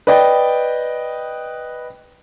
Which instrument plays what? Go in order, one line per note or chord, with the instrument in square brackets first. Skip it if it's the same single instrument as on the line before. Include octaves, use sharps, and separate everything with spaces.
[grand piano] B4 D5 D#5 G5